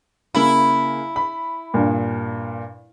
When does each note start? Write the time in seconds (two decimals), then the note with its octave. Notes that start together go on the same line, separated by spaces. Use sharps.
0.35 C#3 A#3 E4
1.16 B5
1.74 G2 A#2